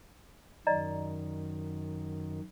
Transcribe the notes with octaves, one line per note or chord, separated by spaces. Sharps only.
F#2 D#3 D5 D#5 A#5